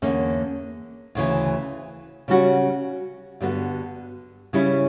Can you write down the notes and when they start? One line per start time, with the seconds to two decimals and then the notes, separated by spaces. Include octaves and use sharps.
0.02 E2 D3 A#3 C#4
1.15 D2 C#3 E3
2.28 C#3 G3 C#4 F#4
3.40 G2 D3 G3 B3 F#4
4.53 C#3 G3 C#4 E4